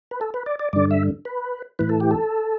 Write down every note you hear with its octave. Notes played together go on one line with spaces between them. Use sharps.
B4
A4
B4
D5
D5
G2 D3 D5
E5
B4
A2 E3 B4
A4
G4
A4